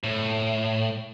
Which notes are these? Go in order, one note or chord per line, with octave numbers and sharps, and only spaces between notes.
A2